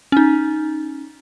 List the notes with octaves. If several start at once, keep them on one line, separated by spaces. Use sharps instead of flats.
C#4 D#4